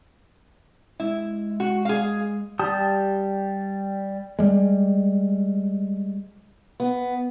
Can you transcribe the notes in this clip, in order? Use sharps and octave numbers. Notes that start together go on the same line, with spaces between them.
G#3 E4
F#4
G#4 F5
G3 G4 A5 D#6
G3 G#3
B3